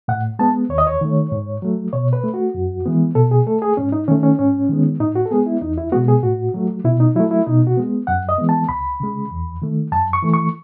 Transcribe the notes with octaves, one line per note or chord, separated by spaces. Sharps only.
A2 F#5
G#3 B3 A5
D#2 C#5
D#5
C#5
D#3 A3
G#2
F#3 A3
B2 C#5
B4
A3
F#4
F#2
E3 G#3 B3
B2 A4
G#4
A3 A4
G#4
G#2 C#4
D#4
D#3 A3 C#4
C#4
G#2 C#4
D#3 G#3 B3
A2 D#4
F#4
A4
G#3 B3 G#4
E4
E2 D#4
E4
B2 G#3 B3 F#4
G#4
A2 F#4
F#3 A3
B2 E4
D#4
F#3 A3 E4
E4
B2 D#4
F#4
G#3 B3
F#2 F#5
D#5
E3 G#3 B3
A5
C#2 B5
C#3 G#3
E2
D#3 A3
F#2 A5
C#6
E3 A3
C#6